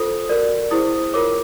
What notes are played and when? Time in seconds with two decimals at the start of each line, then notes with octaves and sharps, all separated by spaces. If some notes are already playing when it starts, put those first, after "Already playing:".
Already playing: F4 A4 C5 D#6
0.29 F#4 A#4 D5
0.71 E4 G#4 C5 D#6
1.14 F4 A#4 C#5 D6